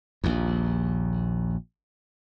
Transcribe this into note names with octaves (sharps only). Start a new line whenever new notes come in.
A#1 D#2